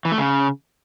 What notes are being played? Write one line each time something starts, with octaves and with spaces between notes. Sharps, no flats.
E3
A3
C#3